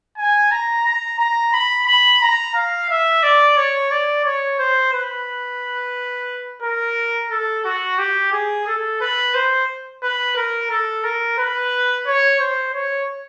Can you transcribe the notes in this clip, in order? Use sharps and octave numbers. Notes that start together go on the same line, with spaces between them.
G#5
A#5
A#5
A#5
B5
B5
A#5
F5
E5
D5
C#5
D5
C#5
C5
B4
A#4
A4
F#4
G4
G#4
A4
B4
C5
B4
A#4
A4
A#4
B4
C#5
C5
C#5